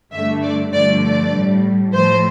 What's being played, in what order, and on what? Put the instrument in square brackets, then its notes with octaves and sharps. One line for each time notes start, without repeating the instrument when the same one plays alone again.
[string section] G2 D3 A3 E5
D5
G2 D3 F3 A3 D5
D5
A2 G3
A2 F3 A3 C5